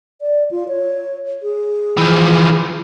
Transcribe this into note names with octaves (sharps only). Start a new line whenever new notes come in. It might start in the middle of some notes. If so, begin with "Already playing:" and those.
D5
F4
C#5
G#4
E3 F3